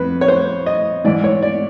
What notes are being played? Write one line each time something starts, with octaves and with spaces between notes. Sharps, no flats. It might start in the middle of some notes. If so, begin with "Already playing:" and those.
Already playing: F2 B4
C#5
C5
D#5
G#2 E3 D5
C#5
D5